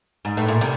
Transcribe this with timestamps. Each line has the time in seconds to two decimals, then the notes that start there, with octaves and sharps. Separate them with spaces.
0.25 G#2
0.37 A2
0.48 A#2
0.61 C3